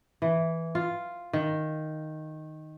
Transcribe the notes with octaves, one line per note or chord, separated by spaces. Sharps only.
E3
F4
D#3